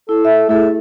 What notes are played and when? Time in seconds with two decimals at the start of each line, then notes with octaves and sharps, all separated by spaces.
0.09 E4 A4
0.25 E5
0.49 A3 E4 G#4 A4